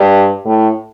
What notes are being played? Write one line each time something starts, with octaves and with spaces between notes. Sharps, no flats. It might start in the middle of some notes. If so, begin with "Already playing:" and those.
Already playing: G2
A2